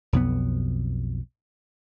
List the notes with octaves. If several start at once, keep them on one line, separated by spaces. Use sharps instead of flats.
B1 F2 B2 B3